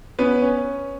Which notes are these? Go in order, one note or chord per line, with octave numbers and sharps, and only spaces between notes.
B3 C#4 B4
C#4